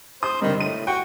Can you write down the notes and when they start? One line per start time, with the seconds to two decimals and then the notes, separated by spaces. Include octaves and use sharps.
0.23 C5 D#6
0.42 G2 D3 D#3
0.61 A2 D#7
0.87 F#4 G5